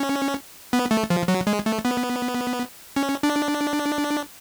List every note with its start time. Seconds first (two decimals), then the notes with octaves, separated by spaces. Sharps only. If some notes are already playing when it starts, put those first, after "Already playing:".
Already playing: C#4
0.73 B3
0.91 A3
1.10 F3
1.28 F#3
1.47 G#3
1.66 A3
1.85 B3
2.96 C#4
3.23 D4